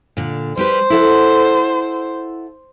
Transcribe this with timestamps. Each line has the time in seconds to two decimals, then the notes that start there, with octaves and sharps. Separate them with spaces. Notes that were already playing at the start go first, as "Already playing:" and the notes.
0.17 A#2 D3
0.57 G3 G4 B4 C5
0.90 E4 A4 F#5